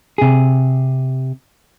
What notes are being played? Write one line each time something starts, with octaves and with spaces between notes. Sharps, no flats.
C3 G#4